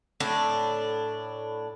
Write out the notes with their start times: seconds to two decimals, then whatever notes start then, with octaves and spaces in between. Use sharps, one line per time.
0.20 A2 D4